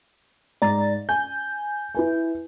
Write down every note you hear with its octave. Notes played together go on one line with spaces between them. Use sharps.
G#2 D5 A#5 A6
G#5 G6
E4 B4 G#5